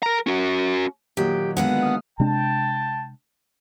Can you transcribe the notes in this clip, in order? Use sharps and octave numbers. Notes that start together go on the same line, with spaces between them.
A#4 A#5
C#4 F#4
A#2 D#3 F#3 G4
D3 G#3 B3 B4 F5 F#5
D#6 F6
C3 G#3 D4 G5 A5